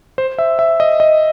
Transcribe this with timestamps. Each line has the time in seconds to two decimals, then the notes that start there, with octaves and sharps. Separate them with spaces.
0.18 C5
0.38 E5
0.59 E5
0.80 D#5
1.00 D#5